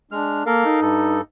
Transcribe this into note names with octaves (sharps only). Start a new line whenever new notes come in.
G#3 D4 F6
A#3 A4 A#4 F5
D#4
G2 A4